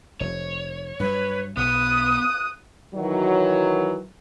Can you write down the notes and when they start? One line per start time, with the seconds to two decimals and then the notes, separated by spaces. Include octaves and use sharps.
0.20 F1 C#5
1.00 G2 F#3 B4
1.57 B1 B3 D#6 F#6
2.95 D#3 E3 F#3